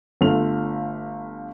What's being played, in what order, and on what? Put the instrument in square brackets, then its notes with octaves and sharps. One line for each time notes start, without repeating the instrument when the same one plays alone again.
[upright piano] G1 A3 F4 F5 F7